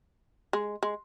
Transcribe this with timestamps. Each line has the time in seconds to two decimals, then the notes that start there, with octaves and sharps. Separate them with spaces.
0.53 G#3
0.83 G#3